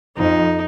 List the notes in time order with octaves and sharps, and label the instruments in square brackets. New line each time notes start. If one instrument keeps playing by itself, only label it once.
[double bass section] F2 [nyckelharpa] D#4